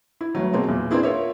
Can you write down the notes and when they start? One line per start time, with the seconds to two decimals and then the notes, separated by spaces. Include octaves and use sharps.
0.21 E4
0.35 G1 D2 F#3
0.53 B2 F#3 G#3 A#3 C4
0.69 E2 A#2
0.91 A#3 C4 D4 E4 G#4
1.03 F4 A#4 C#5 E5